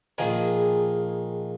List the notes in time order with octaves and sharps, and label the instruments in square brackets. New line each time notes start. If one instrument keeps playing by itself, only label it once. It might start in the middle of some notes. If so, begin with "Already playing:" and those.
[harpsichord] A#1 F3 G#5 [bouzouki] D#3 G#4